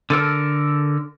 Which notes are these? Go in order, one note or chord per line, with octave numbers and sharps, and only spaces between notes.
D3 A4 A#4